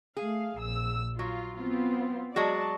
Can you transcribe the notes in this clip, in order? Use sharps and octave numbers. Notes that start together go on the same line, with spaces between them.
A3 G#4 F5
A#1 E6
F#3 F4
B3 C4 F4
F#3 G#3 F#4 D5 A5